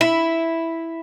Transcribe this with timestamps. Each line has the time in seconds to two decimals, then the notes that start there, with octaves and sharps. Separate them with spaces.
0.01 E4